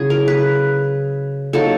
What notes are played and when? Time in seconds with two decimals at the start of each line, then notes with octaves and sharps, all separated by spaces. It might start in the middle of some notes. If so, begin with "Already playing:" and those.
Already playing: C#3 F#3 E4 G#4
0.10 A#4
0.28 B4
1.53 F#3 A#3 D#4 A4